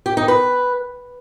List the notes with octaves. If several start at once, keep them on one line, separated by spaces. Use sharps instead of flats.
G4
D#4
B4